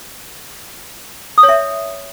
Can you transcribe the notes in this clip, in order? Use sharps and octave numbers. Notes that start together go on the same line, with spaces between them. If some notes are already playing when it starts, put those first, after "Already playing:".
D#6
C#5
E5